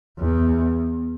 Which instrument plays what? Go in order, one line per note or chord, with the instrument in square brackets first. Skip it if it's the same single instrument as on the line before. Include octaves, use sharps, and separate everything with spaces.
[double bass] E2